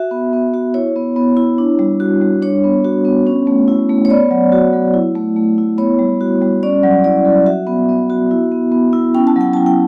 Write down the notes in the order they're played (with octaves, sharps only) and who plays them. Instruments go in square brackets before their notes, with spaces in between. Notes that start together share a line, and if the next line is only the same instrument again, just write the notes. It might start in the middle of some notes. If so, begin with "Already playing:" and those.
Already playing: [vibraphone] F#4 E5
B3
B3
F#4
E4 C#5
B3
B3
E4
D4
G3
F#4
G3
D4 C#5
B3
F#4
B3
C#4
A3
E4
A3
C#5
B3 D5
F#3
F#4
F#3
E4
A3
A3
E4
B3 C#5
G3
F#4
G3
C#4 D5
F#3
E4 D5
F#3
F#4 E5
B3
B3
F#4
E4
B3
B3
E4
C#4 G5
A5
F#3
G5
E4 A5
G5